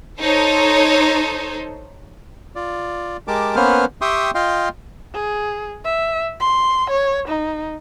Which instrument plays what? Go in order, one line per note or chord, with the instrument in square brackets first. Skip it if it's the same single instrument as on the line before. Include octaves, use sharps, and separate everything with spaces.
[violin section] D#4 A4 C5 C#5
[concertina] F4 D5
G#3 G4 A#4 A5 D6
A#3 B3 C#4 B4 C5 F6
G4 E5 G5 C6 C#6 D#6
F4 D#5 F5 G5 C6
[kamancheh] G#4
E5
C6
C#5
D#4